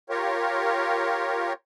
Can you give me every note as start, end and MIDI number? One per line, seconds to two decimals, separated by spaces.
0.10 1.53 65
0.10 1.53 67
0.10 1.53 70
0.10 1.53 73